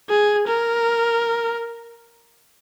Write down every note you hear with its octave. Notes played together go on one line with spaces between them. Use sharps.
G#4
A#4